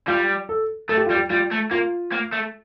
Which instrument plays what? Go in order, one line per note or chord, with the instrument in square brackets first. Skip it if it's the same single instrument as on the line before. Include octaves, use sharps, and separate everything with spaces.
[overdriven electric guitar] G3 [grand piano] F4
[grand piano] A4
[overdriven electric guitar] A3 [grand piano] A4
[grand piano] G4
F4
[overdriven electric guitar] G3
[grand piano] G4
[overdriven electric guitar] G3 [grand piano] F4
[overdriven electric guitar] A3
[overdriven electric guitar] A#3 [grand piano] F4
[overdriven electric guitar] A#3
A3